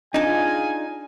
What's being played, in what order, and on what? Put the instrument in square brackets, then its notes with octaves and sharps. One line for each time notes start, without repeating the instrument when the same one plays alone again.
[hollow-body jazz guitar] D4 D#4 [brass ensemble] F4 G#4 G#5